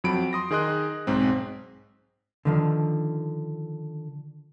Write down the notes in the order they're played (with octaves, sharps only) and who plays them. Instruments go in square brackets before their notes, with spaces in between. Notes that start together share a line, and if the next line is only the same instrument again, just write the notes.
[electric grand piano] F2 F#3 B5 D7
C6 D#6 A#6
D#3 G#4 D#5 C6 F#6
B1 G#2 C4
[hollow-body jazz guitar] D3 D#3 F3